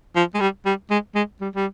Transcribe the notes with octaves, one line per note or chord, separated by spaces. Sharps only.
F3
G#3
G3
G3
G#3
G#3
G3
G3